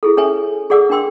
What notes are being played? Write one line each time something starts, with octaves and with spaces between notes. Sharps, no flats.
E4 G#4 A4
C#4 A4 B4 C#5 E5 G#5
G#4 A4 D5 F#5 D6 E6
D4 A#4 G5 C6 E6